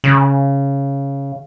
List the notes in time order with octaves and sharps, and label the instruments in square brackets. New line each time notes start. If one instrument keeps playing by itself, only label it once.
[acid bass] C#3